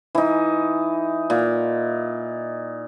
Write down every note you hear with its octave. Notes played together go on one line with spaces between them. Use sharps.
E3 D#4
A#2